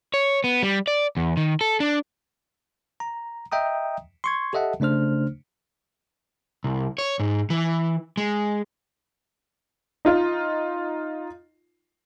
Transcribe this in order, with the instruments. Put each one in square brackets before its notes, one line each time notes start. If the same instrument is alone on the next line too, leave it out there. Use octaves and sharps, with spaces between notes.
[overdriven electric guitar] C#5
B3
G3
D5
E2
D#3
A4
D4
[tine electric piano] A#5
D#5 E5 G5 A#5 D#6
C6 C#6 G#6
G4 A4 D#5 E5 F#5 A5
C#3 A3 D4 C5 F6
[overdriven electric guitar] C2
C#5
G#2
E3
G#3
[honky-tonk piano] D#4 F4